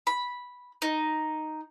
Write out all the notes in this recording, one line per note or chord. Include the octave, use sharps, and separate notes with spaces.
B5
D#4